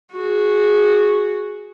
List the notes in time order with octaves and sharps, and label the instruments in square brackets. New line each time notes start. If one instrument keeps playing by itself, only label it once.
[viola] F#4 G#4